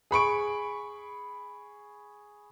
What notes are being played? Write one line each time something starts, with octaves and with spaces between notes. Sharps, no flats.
G#4 B5 C#6 D7